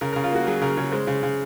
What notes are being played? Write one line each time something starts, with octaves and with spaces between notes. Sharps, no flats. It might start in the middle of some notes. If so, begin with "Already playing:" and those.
C#3 A#4
C#3 A#4
F4
A#3 F#4
F#3 G#4
C#3 A#4
C#3 C#5
G#3 C5
C#3
C#3